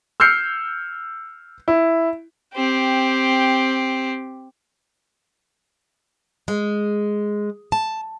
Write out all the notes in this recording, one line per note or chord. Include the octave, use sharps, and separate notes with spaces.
E6 F6 G6 C7 C#7
E4
C4 G4
G#3
A5